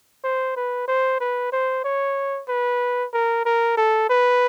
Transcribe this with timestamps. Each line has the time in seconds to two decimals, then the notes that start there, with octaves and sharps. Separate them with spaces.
0.24 C5
0.56 B4
0.88 C5
1.20 B4
1.52 C5
1.84 C#5
2.49 B4
3.13 A#4
3.45 A#4
3.77 A4
4.10 B4